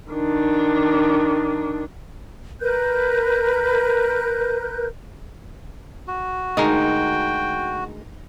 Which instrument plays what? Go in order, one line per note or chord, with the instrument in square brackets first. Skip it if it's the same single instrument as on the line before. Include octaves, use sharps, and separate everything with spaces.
[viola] D#3 D4
[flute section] A#4 B4 F#6 G6
[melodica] F#4
[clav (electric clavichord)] D2 G#3 A#4 [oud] D#4 [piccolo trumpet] G5